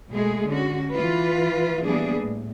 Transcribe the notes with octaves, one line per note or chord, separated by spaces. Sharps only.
B2 G#3 A3 G#4
D3 C#4 F#4
E3 F4 B4
E3 G3 A#3 B3 D4 G#4
A2